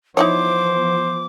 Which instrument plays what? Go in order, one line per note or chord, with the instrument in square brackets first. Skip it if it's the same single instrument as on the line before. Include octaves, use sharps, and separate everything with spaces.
[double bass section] E3 F3 B3 [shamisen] D#4 E4 C#5 [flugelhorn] C5 [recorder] D6